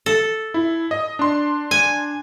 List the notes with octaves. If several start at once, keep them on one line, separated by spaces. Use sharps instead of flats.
A4
E4
D#5
D4 C6
G#5